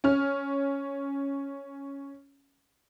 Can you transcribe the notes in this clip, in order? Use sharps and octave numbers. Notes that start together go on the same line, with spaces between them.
C#4 F6